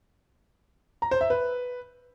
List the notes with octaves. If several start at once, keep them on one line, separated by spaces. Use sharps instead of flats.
A#5
C5
E5
B4